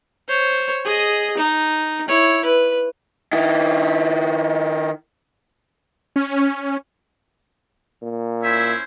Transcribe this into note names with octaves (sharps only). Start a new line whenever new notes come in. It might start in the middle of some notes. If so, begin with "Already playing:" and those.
C5 C#5
G#4 D#5
D#4
E4 C#5
B4
D#3 E4
C#4
A#2
C#4 E4 C5 E5